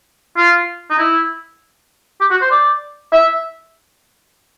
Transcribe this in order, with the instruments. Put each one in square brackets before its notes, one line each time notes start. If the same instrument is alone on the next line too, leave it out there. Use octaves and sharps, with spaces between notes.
[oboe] F4
D#4
E4
G4
F#4
C5
D5
E5